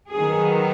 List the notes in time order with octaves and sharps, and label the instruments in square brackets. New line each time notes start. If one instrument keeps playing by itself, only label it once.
[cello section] D#3 F#3 B3 G#4